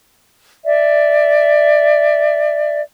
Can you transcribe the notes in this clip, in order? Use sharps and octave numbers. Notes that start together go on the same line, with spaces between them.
D5 E5